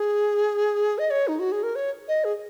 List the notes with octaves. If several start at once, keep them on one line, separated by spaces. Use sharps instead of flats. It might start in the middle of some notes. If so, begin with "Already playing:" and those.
Already playing: G#4
D#5
C#5
D#4
F#4
G#4
A#4
C#5
D#5
G#4